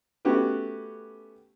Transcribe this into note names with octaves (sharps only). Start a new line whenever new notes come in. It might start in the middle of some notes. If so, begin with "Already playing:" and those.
A3 B3 C#4 F#4 G4 B4